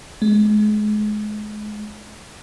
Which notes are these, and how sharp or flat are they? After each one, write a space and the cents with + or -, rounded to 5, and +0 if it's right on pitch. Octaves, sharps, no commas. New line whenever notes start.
G#3 +30